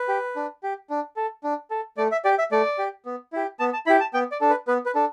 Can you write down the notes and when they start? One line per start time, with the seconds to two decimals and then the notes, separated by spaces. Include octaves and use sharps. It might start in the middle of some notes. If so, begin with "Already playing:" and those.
Already playing: B4
0.08 G4
0.36 D4
0.63 G4
0.90 D4
1.16 A4
1.44 D4
1.71 A4
1.97 A3 D5
2.12 E5
2.25 G4 D5
2.39 E5
2.52 A3 D5
2.78 G4
3.06 B3
3.33 E4 G4
3.59 B3 A5
3.73 A5
3.86 E4 G4 B5
4.00 A5
4.14 B3 G5
4.32 D5
4.41 D4 A4
4.50 B4
4.68 B3 B4
4.86 B4
4.95 D4 A4